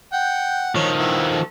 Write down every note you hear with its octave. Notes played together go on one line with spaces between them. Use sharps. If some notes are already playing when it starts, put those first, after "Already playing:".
F#5 G5
D#3 F3 C#5
B3 E4
A4